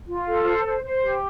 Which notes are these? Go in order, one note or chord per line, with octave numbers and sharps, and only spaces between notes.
F4
A4
C5
C5
C5
G4